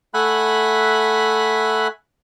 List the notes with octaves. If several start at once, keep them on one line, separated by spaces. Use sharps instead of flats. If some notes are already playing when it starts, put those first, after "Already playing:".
A3 E5 F#5 G#5 B5 F#6